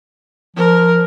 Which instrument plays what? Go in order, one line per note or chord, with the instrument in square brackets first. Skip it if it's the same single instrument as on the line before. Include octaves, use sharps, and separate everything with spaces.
[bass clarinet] F3 [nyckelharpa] A#4